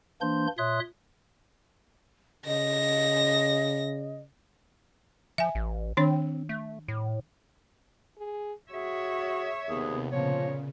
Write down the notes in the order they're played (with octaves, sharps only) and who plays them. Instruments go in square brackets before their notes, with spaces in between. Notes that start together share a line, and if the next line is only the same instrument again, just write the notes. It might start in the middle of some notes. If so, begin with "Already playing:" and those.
[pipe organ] E3 A#3 D4 C5 C6 G6
A#2 C#5 E5 C6 D#6 F#6
[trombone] C#3 [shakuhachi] D#5 [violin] A#6
[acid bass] F3 [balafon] E5 G#5
[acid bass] A1
[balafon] D#3 D4 C#5 [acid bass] C4
[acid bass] A3
A2
[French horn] G#4
[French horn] F#4 [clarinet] G#4 [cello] C#5 E5
[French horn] D#2 [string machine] C3 B3 [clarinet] G#4
[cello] A#2 [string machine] C#3 [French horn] F3 [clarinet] C#5